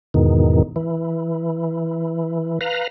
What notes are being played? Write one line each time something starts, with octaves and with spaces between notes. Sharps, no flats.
E2 G#2 B2 D#3
E3
B4 F5 A#5